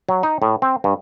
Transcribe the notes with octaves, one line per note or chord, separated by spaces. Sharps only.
F#3
D#4
A2
C4
G2